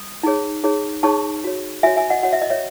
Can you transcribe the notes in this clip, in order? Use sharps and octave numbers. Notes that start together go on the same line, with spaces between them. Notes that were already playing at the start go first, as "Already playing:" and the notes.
Already playing: D#6
D#4 G#4 C#5
D#4 G#4 C#5
D#4 G#4 C#5 A5 C#6
F#4 C#5
F#4 C#5 E5 G#5
E5 G#5
D#5 F#5
F#4 C#5 F#5
E5
D#5
C#5 E5